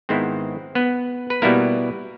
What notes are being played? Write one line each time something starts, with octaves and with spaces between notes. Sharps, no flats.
G#2 D#3 G#3 B3 C4 E4 C5
B3 B4
B4
B2 G3 A#3 B3 E4 A#4